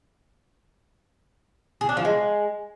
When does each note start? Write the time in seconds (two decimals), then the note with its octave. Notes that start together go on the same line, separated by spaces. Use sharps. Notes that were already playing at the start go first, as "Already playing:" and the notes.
1.81 G#4
1.89 D4
1.97 F3
2.05 G#3